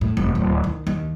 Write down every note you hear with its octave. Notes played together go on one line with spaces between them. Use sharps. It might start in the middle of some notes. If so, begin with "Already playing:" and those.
A2
F1
D1
D#3
D#2